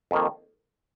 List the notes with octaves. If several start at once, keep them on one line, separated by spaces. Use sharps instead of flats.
F2 D#3 A#3